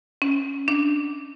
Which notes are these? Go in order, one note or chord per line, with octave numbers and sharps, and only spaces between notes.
C#4
D4